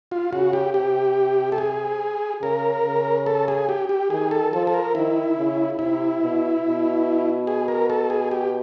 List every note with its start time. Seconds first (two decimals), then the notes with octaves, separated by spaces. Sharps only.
0.12 F4
0.33 C#3 F#4
0.53 G4
0.74 C3 G4
1.52 A4
1.58 G#4
2.42 C#3 A#4
2.85 C#3
3.26 A4
3.48 G#4
3.69 G4
3.89 G4
4.10 D#3 G#4
4.31 A4
4.53 F3 A4
4.67 A4
4.74 A#4
4.95 D#3 E4
5.37 C#3
5.79 C3 E4
6.21 B2
6.64 B2
7.47 G#4
7.68 A#4
7.90 A4
8.10 G#4
8.31 G4